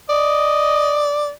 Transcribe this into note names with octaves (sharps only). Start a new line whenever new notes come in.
D5 D#5